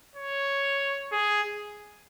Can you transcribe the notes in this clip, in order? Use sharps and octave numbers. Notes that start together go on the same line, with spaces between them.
C#5
G#4